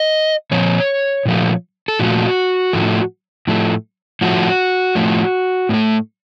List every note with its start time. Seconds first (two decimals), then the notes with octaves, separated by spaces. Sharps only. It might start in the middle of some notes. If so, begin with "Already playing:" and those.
Already playing: D#5
0.51 A#2 F3 C#5
1.26 A#2 F3 A3
1.88 A4
1.99 A#2 F3 A3 F#4
2.73 A2 F3 A3
3.47 A2 F3 A3
4.21 A2 F3 A3 F#4
4.95 A2 F3 A3
5.69 A2
5.74 A3